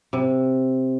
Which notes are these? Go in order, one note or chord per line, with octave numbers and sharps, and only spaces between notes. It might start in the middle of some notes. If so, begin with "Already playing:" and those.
C3